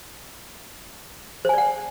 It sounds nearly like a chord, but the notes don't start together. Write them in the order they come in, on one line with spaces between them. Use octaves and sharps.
C5 G#5 D5 F#5